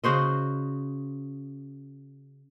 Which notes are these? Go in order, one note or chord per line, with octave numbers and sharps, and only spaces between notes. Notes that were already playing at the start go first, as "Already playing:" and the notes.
C#3 F#4 C5 D#5